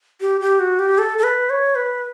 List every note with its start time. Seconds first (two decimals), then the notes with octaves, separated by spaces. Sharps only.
0.21 G4
0.41 G4
0.60 F#4
0.79 G4
0.98 A4
1.18 A4
1.23 B4
1.50 C#5
1.75 B4